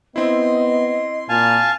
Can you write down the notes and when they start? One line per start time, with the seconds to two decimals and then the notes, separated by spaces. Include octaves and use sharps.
0.16 B3 C4 E4 D#5 C6
1.29 A#2 F5 G#5 A5